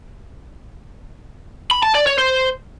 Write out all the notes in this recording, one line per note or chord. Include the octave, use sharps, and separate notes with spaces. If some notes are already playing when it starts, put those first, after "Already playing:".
B5
A5
D5
C#5
C5